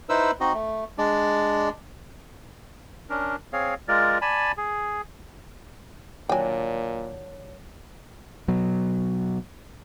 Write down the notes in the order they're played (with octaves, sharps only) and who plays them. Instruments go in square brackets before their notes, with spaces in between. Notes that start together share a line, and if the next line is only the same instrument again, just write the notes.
[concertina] D#4 E4 B4 C5 E6
C4 D#4 F#4 D#5
A3
G#3 D4 D5
C#4 D4 A#4
C4 G#4 C#5 F5
G#3 F4 A#4 D5
D5 G#5 A5 B5
G#4
[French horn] A#2 [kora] D#3 F#3 D4 [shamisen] G5 G#5
[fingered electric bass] B2 F#3